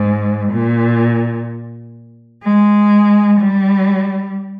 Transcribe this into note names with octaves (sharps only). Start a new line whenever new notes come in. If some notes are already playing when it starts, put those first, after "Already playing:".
Already playing: G#2
A#2
G#3
G3